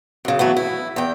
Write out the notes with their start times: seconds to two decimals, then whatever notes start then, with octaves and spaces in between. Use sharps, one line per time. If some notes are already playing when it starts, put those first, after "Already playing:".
0.25 F#2 C#3
0.39 E3 F#3 A3 B3
0.57 E4
0.96 E2 G5